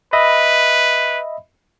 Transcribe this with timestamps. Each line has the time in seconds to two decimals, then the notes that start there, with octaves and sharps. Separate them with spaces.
0.13 B4 D#5 E5 B5